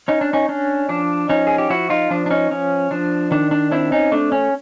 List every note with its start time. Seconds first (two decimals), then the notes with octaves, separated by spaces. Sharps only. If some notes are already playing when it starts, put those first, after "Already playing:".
0.08 C#4 D#4
0.21 D4
0.33 C#4 D#4
0.49 C#4 D4
0.89 F3 D4
1.29 F3 C#4 D#4
1.47 G#4
1.58 G4
1.70 F3 E4 F#4
1.90 D#4 F4
2.10 F3 D4
2.26 D4
2.31 C#4 D#4
2.51 F3 C#4
2.91 F3 D4
3.31 D#3 D4
3.51 D4
3.71 C4 D4 E4
3.92 C#4 D#4
4.12 A3 D4
4.32 C#4